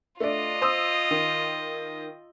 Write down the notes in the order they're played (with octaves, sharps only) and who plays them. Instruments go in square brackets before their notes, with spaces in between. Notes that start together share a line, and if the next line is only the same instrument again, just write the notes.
[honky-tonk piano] A3 D4 [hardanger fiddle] F4 D#5
[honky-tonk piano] C5 D#6 E6
D#3